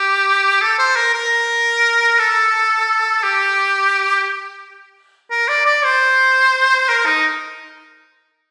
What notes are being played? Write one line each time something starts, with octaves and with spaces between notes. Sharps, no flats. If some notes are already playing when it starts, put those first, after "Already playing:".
Already playing: G4
A4
C5
A#4
A#4
A4
G4
A#4
D5
D5
C5
A#4
D#4